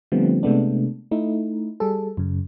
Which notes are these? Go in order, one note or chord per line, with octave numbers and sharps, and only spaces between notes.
D3 F3 G3 A3 B3 C4
C3 G#3 A3 B3 D4
A3 D#4 E4
G3 G#4 A4
F#2 C#3